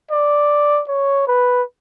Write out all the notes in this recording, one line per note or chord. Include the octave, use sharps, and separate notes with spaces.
D5
C#5
B4